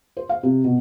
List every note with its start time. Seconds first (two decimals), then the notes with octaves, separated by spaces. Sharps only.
0.17 C5
0.29 F5
0.43 C3
0.64 B2